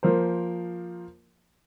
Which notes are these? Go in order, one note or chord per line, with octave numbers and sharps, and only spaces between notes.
F3 A#3 A#4 C5